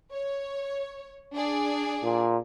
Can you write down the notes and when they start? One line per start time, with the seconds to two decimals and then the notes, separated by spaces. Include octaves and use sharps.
0.11 C#5
1.34 D4 G#4 D5
2.03 A#2